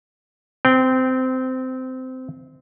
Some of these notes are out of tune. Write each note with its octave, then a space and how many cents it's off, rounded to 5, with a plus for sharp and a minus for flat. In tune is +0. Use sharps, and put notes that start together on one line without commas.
C4 -20 G5 +0